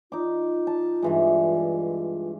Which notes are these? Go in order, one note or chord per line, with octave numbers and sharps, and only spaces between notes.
D#4 F4 D6
A5
G2 E3 G#3